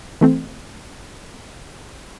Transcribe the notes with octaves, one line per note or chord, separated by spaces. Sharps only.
E3 A3 C4